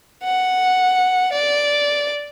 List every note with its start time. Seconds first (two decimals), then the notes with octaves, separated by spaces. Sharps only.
0.24 F#5
1.32 D5